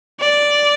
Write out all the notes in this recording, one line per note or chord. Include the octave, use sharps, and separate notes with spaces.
D5